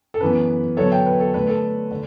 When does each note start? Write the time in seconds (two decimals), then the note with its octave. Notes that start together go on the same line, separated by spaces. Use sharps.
0.14 A4
0.20 F#2 E3 B3 B4
0.77 D3 F#3 B3 A4 C#5
0.92 E5 G5
1.06 B4
1.20 A4
1.34 D3 A3 D4 B4
1.48 A4
1.91 D3